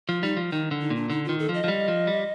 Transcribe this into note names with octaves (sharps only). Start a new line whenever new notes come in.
F3 F4
G3 D#4
F3
D#3 D#4
D3
D#4
A#2
D4
D3 D#4
D#3 F4
A4
F3
D#5
F3
G3
F3
G3